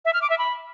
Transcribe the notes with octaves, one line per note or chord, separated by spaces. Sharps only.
E5
F6
D6
E5
B5